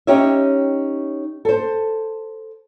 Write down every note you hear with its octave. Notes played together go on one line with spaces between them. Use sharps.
C#4 D#4 G4 C#5 D#5 E5
A4 C5